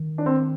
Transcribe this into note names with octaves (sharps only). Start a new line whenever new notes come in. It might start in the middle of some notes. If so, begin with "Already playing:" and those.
Already playing: D#3
D4
C4